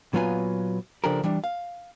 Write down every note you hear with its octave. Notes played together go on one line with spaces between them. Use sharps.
A#2 F#3 B3 F4 B4 G#5
C#3 F3 D4 G4 A4 A#4
E3 G3 D4
F5